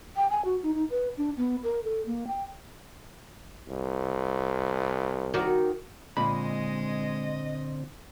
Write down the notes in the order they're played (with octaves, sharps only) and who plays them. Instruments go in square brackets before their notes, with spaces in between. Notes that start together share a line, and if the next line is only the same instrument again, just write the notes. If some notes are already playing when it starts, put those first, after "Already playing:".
[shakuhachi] G5
G#5
F#4
D#4
D#4
B4
D4
B3
A#4
A4
A#3
G5
[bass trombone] C2
[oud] D#3 F#4 D5
[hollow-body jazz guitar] A#2 B5 [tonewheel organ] D3 C4 [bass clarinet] G#3 [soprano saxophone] D#5